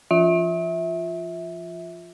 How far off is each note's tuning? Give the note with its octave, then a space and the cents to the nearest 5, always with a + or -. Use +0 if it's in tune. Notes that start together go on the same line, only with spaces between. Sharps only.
F3 -30 F4 +5 E5 -15